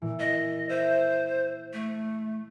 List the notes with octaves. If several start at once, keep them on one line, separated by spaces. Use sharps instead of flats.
A#2 E3
D#5
C5 E5
A3